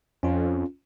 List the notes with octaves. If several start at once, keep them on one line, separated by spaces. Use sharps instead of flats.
F2 C#4 F4